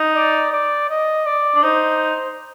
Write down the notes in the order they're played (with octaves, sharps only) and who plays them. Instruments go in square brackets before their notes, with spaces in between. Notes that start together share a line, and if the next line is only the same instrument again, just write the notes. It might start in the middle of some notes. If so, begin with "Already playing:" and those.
Already playing: [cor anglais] D#4
[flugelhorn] D5
D5
D#5
D5
[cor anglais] D4
[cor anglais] D#4 [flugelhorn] C5